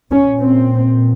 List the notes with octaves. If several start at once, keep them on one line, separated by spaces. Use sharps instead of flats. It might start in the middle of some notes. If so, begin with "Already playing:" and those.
A#2 C#4
C4